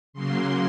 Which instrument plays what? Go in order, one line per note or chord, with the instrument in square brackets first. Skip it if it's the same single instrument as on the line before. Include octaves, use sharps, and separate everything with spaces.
[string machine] C#3 F#3 A#3 C6